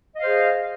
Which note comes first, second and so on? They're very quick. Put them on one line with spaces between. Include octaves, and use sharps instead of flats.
D#5 F5 C5 G#4